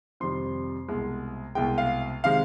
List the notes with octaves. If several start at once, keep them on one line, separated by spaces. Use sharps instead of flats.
F2 C3 D#3 G3 C6
C2 B2 G#3
C2 B2 G#3 G5
F5
C3 D#3 G#3 F5